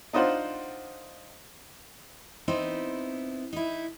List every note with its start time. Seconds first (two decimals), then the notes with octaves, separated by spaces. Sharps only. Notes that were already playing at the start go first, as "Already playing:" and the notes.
0.13 D4 D#4 F4 C5 F#5
2.48 B3 C4 D#4 E4
3.53 D#4 E4